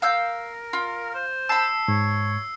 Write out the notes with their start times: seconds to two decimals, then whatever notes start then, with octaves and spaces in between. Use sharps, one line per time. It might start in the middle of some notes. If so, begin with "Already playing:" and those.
0.02 A#4 F5 E6 G6
0.73 F4
1.14 C5
1.49 A5 B5 E6 C7
1.88 G#2 C#5